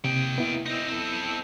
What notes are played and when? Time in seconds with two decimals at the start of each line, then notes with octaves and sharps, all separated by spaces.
0.04 C3 A#3 G5
0.38 B3 E4
0.66 C4 D#4
0.88 C4 A4